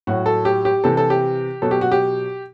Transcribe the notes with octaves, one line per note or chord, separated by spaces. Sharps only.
A2 F#3 F#4
A4
G4
G4
C3 E3 A4
A4
G4
B2 F#3 A4
G4
F#4
G4